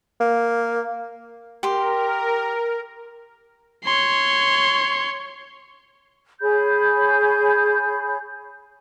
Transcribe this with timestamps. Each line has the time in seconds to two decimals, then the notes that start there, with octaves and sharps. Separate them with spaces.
0.20 A#3
1.63 G4 A#4 C6
3.84 C#5 C6
6.41 G#4 C#5 B5 G6